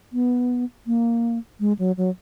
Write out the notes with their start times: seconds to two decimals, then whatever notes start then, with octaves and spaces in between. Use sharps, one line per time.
0.13 B3
0.87 A#3
1.60 G#3
1.79 F#3
1.97 F#3